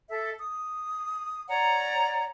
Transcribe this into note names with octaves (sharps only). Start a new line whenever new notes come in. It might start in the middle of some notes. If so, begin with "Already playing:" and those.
A4 E5
D#6
C#5 D5 F#5 A#5